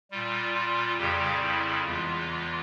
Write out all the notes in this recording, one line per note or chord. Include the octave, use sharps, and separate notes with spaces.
A#2 G3 F4
F4
F2 C#3 G3 G4
E4
E2 E3 G#3 F4